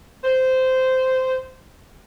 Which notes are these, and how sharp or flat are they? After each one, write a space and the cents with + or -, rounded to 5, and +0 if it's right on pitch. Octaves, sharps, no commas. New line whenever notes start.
C5 -15